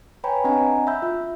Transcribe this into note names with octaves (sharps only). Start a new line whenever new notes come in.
B4 C#5 G5 G#5 A#5 B5
C4 D4 D#5 F#5 G#5 A#5
E5 B5 E6 G6
F4 E5